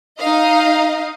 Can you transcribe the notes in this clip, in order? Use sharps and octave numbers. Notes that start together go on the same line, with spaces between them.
D#4 D#5 F5